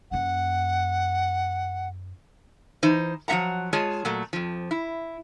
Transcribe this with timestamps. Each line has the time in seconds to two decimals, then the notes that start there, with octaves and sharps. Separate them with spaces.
0.11 F#2 A#3 F#5
2.83 E3 D#4 C5
3.28 F3 F#3 B3 E5 F#5 A#5
3.73 G#3 F4 G#4 C#5 A5
4.05 A#2 F#3 A3
4.33 F2 F3
4.71 E4